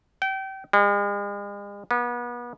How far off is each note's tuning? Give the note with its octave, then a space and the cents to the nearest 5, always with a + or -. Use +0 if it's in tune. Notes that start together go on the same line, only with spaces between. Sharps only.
G5 -30
G#3 -45
B3 -35